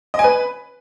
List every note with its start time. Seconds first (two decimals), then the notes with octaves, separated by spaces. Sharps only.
0.14 D#5
0.19 G#5
0.24 B4